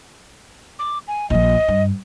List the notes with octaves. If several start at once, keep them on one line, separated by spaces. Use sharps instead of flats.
D6
G#5
A#1 F3 D#5
G2